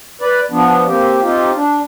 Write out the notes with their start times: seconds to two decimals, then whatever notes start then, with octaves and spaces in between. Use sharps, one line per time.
0.21 B4 D5
0.51 F3 B3 D4
0.87 A#3 C4 G4
1.22 C4 D#4 F4 G4
1.56 D4